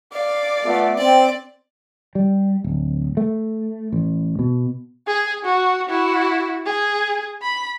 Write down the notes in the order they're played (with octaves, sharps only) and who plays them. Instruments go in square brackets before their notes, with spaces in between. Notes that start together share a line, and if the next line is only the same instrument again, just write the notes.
[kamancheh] D5 [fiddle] F5
[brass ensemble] A3 B3 F4
[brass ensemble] C4 [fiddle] D5
[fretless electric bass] G3
D1
A3
A1
B2
[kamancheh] G#4
F#4
E4 F#4
G#4
B5